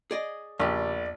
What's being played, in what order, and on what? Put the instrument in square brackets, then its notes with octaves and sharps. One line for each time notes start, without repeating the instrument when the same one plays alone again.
[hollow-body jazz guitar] G#4 D5 D#5
[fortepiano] A#1 [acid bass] E2 [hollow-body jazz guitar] C#3 G4 [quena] D5